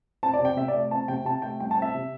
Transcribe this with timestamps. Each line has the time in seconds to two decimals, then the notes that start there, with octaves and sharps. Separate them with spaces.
0.23 C4 A5
0.34 D5
0.39 C3
0.45 G5
0.57 C3 E5
0.68 D5
0.74 A3
0.91 C4 A5
1.08 C3 G5
1.25 C3 A5
1.42 A3 G5
1.60 G3 G5
1.71 A5
1.77 C4 E5
1.95 C3